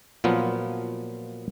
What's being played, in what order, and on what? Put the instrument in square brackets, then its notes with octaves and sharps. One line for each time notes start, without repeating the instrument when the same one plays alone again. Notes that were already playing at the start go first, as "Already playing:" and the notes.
[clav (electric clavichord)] A#2 F3 F#3 B3 F4